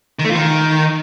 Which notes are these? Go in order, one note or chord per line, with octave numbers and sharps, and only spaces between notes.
D#3
A3
F4
D#3